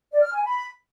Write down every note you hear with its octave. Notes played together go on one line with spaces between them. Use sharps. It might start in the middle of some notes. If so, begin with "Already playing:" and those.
D5
F6
G#5
B5